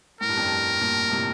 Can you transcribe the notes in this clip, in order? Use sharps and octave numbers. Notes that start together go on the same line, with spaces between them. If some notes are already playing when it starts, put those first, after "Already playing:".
A2 A#4
G2
F2
G2
G2 A#2
A2 C3